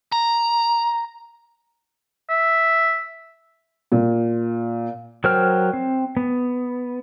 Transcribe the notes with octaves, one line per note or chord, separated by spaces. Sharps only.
A#5
E5
A#2
F#3 A#4 C5 G5 F6
C4
B3